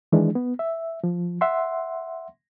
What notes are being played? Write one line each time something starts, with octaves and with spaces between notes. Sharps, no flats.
D#3 E3 G#3 D4
B3
E5
F3
E5 F#5 C6